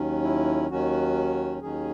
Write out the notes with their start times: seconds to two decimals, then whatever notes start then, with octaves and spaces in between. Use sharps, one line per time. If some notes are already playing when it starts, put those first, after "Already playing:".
Already playing: D#2 D#3 F#3 C#4
0.24 E4
0.70 D#2 D#3 F#3 C#4 F#4
1.62 D#2 D#3 F#3 C#4 G#4